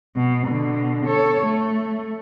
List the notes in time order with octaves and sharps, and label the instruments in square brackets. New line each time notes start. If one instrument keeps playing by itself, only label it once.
[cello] B2
B2 D3
A4 C#5
A3